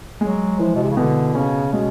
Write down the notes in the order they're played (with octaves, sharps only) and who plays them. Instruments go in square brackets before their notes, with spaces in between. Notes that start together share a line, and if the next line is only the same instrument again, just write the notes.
[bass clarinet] F#3 [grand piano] G#3
[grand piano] E3 [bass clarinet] F3
[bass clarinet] B2
C3
C#3
[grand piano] B2 [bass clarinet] D3
[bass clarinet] C#3 [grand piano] C#4
[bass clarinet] B2 [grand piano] G#3